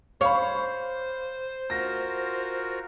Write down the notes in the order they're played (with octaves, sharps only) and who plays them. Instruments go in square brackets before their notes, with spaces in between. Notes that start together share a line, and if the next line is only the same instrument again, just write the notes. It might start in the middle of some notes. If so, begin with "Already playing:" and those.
[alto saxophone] C5 [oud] C#5 [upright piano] F5 B5
[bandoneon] F4 F#4 A#4 [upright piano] A#6